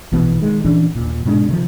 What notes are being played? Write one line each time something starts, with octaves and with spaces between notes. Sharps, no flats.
A#1 B2 E3 B3
D#3 G#3
A#2 E3 C#4 D4
D#2 A#2
G#2 B2 G#3 D4
C3 D#3 F3